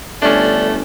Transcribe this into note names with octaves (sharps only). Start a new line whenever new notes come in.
G1 A3 C#4 D4 D5